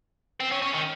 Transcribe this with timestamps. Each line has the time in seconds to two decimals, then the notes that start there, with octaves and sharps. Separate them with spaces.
0.40 C4
0.52 C#4
0.62 C#4
0.74 D#3